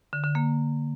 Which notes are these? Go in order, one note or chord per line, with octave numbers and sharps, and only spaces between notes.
D3
D3
A#3